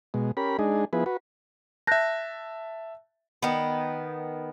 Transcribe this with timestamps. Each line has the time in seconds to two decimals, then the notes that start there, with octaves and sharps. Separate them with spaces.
0.14 B2 G#3
0.37 C#4 G4 A#4 B5
0.59 G#3 D4 D#4 G#4
0.93 F3 B3 E4 G#4 B4
1.06 F#4 B4
1.87 E5 A5 F#6 G6 A#6
3.43 D#3 B3